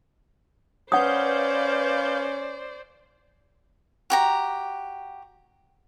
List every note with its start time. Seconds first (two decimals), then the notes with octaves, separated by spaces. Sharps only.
0.92 C#4 B4 C5 D5 F5 F#5 D#6 G6
4.10 F#4 G4 A#5